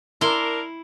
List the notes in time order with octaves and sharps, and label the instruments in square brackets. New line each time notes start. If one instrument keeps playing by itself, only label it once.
[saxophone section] D4 A#4 [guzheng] E4 C6